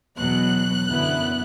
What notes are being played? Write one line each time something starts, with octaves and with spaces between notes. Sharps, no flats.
E2 B2 F#3 F#6
F#2 D3 B3 E4